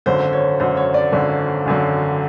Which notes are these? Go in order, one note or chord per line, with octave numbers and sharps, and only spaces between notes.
G#1 F#2 D3 C5
C#5
G#1 F#2 D3 C5
C#5
D5
G#1 F#2 D3
G#1 F#2 D3